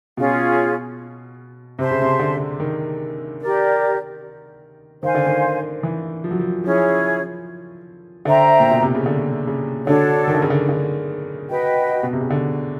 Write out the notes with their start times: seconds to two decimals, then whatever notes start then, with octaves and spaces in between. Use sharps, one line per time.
0.17 B2 C#4 F4 G#4
1.79 C3 C5 E5 A5 C6
1.91 C#3
2.02 C3
2.19 D3
2.60 D#3
3.40 G4 A#4 D5
5.03 D#3 C5 F5 G#5
5.15 D3
5.26 D#3
5.83 E3
6.24 F3
6.31 F#3
6.39 F3
6.64 F3 C#4 E4 G#4 C#5
8.25 D3 C5 E5 G5 A#5
8.60 A#2
8.71 B2
8.83 C3
8.95 C#3
9.06 D3
9.47 C#3
9.87 D3 D4 F#4 A4 C#5
10.27 D#3
10.35 D3
10.42 C#3
10.50 D3
10.69 D3
11.49 F#4 B4 D#5 G5
12.03 B2
12.13 C3
12.21 C#3
12.30 D3